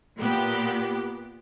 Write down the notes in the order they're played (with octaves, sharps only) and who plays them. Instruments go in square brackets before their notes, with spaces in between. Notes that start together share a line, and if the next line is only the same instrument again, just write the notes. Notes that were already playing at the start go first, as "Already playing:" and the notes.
[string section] A#2 B3 G4